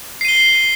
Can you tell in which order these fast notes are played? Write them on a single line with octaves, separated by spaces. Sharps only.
C7 D#7 G7